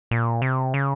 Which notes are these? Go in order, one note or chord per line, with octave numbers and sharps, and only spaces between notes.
A#2
C3
C#3